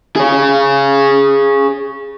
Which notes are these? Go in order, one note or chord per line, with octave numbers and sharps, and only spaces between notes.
G#4 C#5